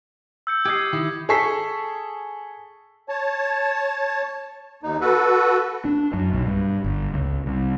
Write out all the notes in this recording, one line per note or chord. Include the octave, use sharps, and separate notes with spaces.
E6 G6 C#7
G4 D#5 G#6 C7
D#3 E4 G4
G#4 A4 A5 C#6 B6 C7
C#5 A5
D#2 D#4
F#4 A4 B4
D4
F#2
B1
G2
G1
C#2
C2